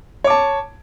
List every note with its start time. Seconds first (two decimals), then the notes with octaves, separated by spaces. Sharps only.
0.24 C#5
0.27 D6
0.30 A5